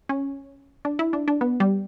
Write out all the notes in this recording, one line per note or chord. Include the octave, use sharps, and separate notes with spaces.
C#4
D4
E4
D4
D4
B3
G3